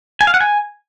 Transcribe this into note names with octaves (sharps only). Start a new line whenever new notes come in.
G#5
F5
F#5
G#5